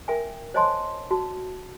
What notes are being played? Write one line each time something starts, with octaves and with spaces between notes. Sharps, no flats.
A#4 E5 G5 G#5
C5 C#5 D#5 G#5 A5 C6
F#4 A5